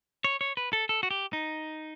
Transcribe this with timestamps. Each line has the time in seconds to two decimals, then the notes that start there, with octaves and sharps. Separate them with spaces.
0.24 C#5
0.41 C#5
0.57 B4
0.73 A4
0.89 A4
1.03 F#4
1.11 G4
1.33 D#4